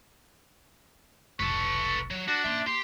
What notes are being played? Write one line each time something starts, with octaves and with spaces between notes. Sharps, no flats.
F1 B1 A4 B4 C#6
F#3
D4 F#4
A#3 E5 C6
G4 C6